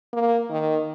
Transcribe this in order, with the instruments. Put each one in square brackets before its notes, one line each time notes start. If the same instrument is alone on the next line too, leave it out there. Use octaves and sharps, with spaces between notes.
[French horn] A#3
D#3